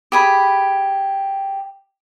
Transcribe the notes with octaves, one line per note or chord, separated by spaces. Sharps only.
G4 G#4 B5